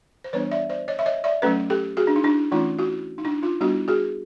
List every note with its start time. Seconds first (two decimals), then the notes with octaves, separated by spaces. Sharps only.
0.24 C5
0.33 E3 G3 B3 D4 B4 C#5
0.51 D5 E5
0.70 C5 D5
0.88 C#5 D#5
0.99 E5
1.06 C#5 D#5
1.24 D5 E5
1.42 F#3 A3 C#4 A4 B4
1.70 G4 A4
1.97 F#4 G#4
2.07 D4
2.16 D#4
2.24 D4 E4
2.52 E3 A3 C#4 D#4 F4
2.79 E4 F#4
3.18 D#4
3.25 D4 E4
3.42 D#4 F4
3.61 G3 B3 D4 E4 F#4
3.88 F#4 G#4